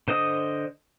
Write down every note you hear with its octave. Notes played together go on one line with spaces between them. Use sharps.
D3 C5 D#5 D#6